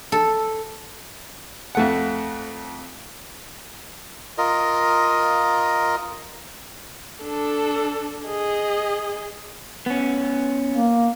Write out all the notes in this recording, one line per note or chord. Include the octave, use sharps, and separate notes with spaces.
A4
F2 A3 F#5
F4 A#4 D#5
D4 A4
G#4 D#5
B3 C#4
A#3